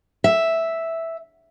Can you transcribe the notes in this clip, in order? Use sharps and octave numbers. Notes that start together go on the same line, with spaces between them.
E5